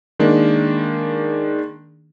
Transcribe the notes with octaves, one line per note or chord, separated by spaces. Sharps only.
D#3 G#3 A#3 D4